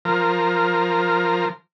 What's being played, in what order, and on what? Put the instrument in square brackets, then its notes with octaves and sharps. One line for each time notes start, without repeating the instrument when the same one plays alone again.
[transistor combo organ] F3 A#4